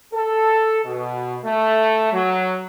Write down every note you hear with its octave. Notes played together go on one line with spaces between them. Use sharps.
A4
B2
A3
F#3